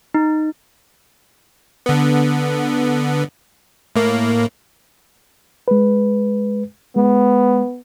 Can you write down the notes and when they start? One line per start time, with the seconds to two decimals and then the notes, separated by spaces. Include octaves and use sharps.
0.14 D#4
1.86 D3 B3
3.96 A2 A#3
5.68 G#3 B4
6.96 G#3 B3